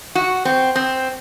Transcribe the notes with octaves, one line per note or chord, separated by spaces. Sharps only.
F#4
C4
C4